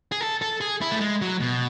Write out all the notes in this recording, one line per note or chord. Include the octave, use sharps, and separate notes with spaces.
G#4
A4
A4
G#4
E4
A3
G#3
F#3
B2